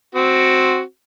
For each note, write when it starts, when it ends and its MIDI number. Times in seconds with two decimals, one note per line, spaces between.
0.15 0.80 60
0.15 0.80 66